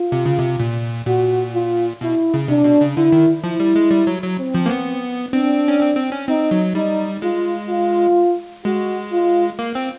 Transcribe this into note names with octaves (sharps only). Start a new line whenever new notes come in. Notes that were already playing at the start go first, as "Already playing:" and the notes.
Already playing: F4
C3
C#3
C3
A#2
A#2 F#4
F4
B2 E4
C#3
C3 D4
B2
C#3
D3 E4
D#3
F3 E4
G3
G#3
G3
F#3
F#3
C4
F3
A#3
B3
C4 D4
C#4
C4
C4
C#4
C4 D#4
F#3
G3 D#4
G#3 F4
F4
G#3 F#4
F4
A#3
C4